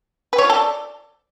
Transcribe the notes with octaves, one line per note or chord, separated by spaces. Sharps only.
B4
C#5
F4
A4
D5